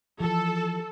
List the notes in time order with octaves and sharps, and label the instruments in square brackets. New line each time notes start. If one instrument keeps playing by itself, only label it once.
[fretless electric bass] E3 F3 [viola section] A4